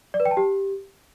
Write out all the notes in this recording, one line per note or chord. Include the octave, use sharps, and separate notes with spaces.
D5
B4
G5
A5
G4